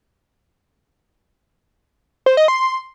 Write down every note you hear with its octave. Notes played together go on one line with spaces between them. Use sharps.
C5
D#5
C6